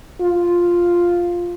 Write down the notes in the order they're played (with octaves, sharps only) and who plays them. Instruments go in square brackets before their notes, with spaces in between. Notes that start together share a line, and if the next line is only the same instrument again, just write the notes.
[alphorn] F4